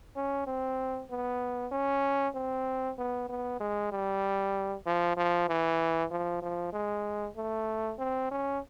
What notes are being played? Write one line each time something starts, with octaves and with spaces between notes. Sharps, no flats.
C#4
C4
B3
C#4
C4
B3
B3
G#3
G3
F3
F3
E3
F3
F3
G#3
A3
C4
C#4